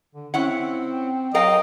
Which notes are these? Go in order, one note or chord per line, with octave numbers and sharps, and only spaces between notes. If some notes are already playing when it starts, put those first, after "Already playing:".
D3
C4 C#4 E4 F#5
F#3 A#4 D#5 F5 G5